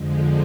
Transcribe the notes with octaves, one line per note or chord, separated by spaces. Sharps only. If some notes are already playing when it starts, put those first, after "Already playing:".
Already playing: F2 D3 F3 G#3